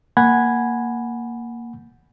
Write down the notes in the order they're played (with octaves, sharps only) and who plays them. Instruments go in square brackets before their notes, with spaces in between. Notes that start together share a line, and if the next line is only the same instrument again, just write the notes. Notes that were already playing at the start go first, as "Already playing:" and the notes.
[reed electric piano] A#3 F#5 G#5 B5 G#6